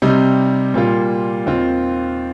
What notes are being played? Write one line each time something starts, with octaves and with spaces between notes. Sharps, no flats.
C3 G3 D#4
A#2 G3 A#3 F4
D#2 D#3 C4 F4